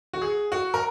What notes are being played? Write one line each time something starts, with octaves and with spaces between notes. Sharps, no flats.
F#4
G#4
F#4
A#4